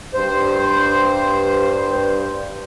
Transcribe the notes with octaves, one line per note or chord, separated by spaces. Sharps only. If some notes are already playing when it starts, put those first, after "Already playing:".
G2 C5